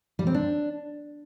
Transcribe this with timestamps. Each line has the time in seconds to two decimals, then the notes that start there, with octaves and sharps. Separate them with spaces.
0.19 G3
0.27 C4
0.34 D4